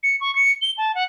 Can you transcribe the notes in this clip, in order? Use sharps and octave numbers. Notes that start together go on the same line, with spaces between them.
C#7
C#6
C#7
G7
A5
F#5